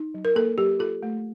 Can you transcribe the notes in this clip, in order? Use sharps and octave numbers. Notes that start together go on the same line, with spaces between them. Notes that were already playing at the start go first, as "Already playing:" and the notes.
Already playing: D#4
F#3
A#4
A#3 A4
F#3 G4
F4 A4
A3